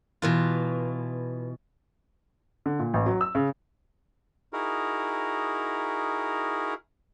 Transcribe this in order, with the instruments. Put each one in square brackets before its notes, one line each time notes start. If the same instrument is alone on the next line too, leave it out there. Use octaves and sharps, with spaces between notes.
[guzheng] B2 E3 F4
[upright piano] D3
A#2
A1
F#3
E6
C#3
[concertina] D#4 E4 F#4 G#4 A#4